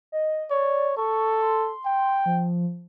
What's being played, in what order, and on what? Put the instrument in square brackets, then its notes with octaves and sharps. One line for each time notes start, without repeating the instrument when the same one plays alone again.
[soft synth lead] D#5
[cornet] C#5 [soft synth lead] D5
[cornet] A4 [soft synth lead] C#6
[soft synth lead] C6
[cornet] G5
[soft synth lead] F3